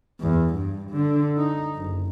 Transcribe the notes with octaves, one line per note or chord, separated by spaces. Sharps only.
E2
G2
D3
D#4
F#1